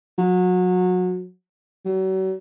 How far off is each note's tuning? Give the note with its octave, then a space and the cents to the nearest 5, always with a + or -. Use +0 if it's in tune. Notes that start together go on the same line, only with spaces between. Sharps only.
F#3 -25
F#3 +40